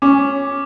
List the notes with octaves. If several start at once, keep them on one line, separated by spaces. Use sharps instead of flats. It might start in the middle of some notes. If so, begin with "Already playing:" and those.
C#4 D6